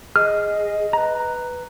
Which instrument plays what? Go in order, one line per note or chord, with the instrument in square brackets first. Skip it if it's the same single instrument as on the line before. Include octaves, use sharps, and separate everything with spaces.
[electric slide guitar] G#4 [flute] D#5 [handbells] F6
[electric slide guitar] B4 A#5